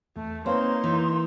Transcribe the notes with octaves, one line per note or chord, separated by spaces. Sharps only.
E2 A3
A#3 C4 D#4 B4 C#5 F5 C6
E3